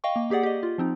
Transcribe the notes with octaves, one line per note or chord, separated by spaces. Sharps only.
D#5 F5 G5 C#6
A#3
A#3 G4 G#4 D5 F#5
G4 D#5
F4
F3 C4 D#4